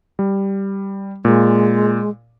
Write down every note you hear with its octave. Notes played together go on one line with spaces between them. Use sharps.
G3
A#2 G#3